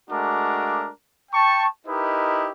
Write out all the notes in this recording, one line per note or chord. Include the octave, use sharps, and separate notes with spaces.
G#3 A3 D4 F#4 A#4 D6
G5 A5 C#6
D#4 E4 G4 A#4 B4 D#5